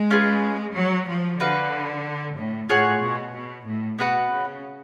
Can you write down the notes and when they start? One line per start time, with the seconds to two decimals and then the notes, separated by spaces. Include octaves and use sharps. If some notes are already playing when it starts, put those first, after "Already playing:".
Already playing: G#3
0.10 C#4 F4 G#4 B4
0.75 F#3
1.08 F3
1.40 D3 F#4 B4 F5
2.37 A2
2.69 A2 F4 G#4 C#5 F#5
3.02 B2
3.34 B2
3.66 A2
3.99 B2 B3 F#4 B4 F#5
4.31 C#3